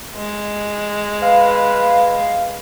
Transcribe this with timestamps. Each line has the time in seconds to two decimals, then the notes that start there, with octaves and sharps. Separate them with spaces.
0.15 G#3
1.22 B4 F5